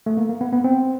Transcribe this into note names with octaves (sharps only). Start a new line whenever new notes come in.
A3
A#3
A#3
B3
B3
C4